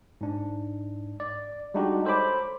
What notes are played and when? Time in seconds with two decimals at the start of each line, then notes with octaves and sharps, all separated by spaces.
0.21 G#2 D4
1.20 D5
1.74 G3 G#3 D4 D#4 F#4 G4
2.05 A4 C5 C#5 B5 D6